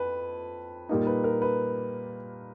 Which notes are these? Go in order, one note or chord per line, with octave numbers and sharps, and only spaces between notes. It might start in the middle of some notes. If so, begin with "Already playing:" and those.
Already playing: F2 B4
A#2 G3 A#3 D#4
B4
A#4
B4